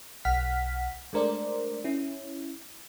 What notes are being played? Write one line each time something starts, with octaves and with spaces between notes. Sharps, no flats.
B1 F#5 F6 B6
G#3 A3 D4 A#4 C5 D5
C#4 E4